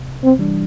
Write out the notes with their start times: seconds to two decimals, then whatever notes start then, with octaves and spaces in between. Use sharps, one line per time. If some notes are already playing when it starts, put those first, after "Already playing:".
Already playing: C3
0.23 C4
0.39 E3 G3 D4